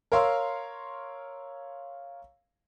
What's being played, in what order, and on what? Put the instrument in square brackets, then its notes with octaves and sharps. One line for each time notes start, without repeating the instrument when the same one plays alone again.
[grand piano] A#4 C#5 F5 C6 E6